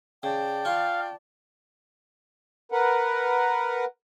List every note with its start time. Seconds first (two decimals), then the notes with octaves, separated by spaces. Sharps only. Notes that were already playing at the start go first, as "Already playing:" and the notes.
0.23 C#3 D5 G5 A5
0.65 F4 F5 C#6
2.72 A#4 B4 F#5